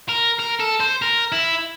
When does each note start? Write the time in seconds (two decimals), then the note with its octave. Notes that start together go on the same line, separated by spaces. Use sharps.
0.09 A#4
0.40 A#4
0.60 A4
0.80 C5
1.02 A#4
1.32 E4